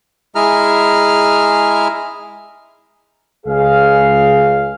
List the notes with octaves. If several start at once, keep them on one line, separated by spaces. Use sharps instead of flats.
G#3 E4 G#4 A#5 F6
C#2 G#4 F5